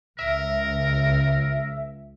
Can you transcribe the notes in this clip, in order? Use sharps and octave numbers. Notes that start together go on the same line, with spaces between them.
C#2 A#4 E5